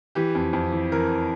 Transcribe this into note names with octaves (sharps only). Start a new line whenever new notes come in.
E3 G4
F2
F2
E3
E3 A#4